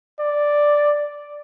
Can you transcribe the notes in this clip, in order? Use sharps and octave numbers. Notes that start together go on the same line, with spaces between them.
D5